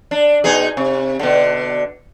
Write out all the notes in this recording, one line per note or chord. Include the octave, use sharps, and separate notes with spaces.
D4
B2 D#4 G#4
C3
B2 D3